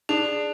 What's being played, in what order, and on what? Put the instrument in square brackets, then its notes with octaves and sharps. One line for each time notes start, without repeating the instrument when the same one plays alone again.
[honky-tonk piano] D4 [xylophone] G#4